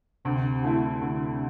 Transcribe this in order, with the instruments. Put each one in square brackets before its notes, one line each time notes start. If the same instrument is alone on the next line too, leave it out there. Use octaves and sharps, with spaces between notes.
[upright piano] D2 [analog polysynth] C3
[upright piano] D3 A3 E4
D2